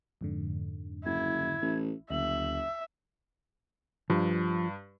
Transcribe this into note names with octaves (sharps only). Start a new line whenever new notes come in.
F2 G#2 D3
F#1 E4 G#6
A1
F#1 D2 E5 F#7
G2 F3